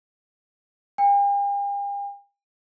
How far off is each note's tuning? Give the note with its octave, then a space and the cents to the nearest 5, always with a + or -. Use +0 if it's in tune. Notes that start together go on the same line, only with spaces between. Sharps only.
G5 +45